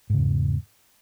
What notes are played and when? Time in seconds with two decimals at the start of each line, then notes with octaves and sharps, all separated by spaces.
0.10 G#2
0.14 C#3
0.18 E2